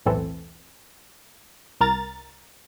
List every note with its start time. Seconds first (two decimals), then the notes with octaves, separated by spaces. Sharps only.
0.06 B1 E2 A2 E3 C4 A4
1.80 C2 A#4 A#5 A6